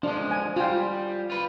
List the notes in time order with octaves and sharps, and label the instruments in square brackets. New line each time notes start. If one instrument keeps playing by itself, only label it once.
[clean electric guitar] F3 G#3 [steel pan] D4
[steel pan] G#5
[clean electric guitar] G3 [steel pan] F4 G5
[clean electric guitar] F4 B4